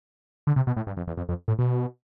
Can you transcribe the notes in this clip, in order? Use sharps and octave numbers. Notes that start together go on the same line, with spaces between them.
D3
C3
B2
A2
G2
F2
E2
F2
F2
A2
B2